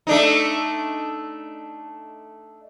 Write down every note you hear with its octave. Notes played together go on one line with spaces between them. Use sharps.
A3 D4 D#4